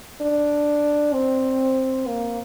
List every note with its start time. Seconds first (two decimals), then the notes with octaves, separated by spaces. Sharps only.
0.21 D4
1.13 C4
2.07 A#3